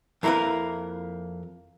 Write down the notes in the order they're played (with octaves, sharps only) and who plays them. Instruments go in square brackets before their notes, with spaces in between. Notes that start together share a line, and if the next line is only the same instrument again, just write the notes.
[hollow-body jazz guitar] F2 A#3 E4 A#4 B4 F5